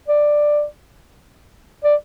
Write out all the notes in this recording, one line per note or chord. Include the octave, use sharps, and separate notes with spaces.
D5
D5